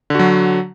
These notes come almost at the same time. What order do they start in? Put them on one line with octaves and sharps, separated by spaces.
D3 F#4 F#3